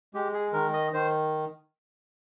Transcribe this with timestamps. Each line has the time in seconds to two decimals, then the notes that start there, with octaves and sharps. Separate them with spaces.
0.14 G#3 G4
0.33 G#4
0.53 D#3 A#4
0.73 D#5
0.93 D#3 C5